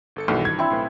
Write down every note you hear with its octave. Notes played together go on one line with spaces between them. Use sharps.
G1 A4 C#7
B1 G2 D#3 E3
G#6
C4 D4 E4
B1 A2 B4